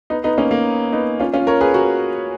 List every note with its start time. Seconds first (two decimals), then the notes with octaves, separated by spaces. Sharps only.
0.10 B3 D#4
0.24 B3 D#4
0.38 A#3 C#4
0.51 A#3
0.92 B3 D#4
1.19 C#4 F4
1.34 C#4 F4
1.47 A#4 C#5
1.61 G#4 B4
1.74 F#4 A#4